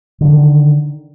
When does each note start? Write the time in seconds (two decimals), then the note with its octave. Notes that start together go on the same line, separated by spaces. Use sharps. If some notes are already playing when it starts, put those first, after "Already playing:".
0.21 D3
0.24 F3
0.28 D#3